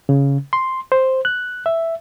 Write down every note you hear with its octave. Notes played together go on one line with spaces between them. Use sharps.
C#3
C6
C5
F#6
E5